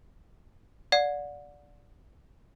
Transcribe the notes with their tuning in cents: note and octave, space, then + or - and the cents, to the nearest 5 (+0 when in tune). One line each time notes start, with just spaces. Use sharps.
D5 -10 F#5 -30